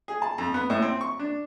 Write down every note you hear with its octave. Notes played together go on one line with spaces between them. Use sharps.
G#4
A5
F2
B3
A2
C4
C#6
D4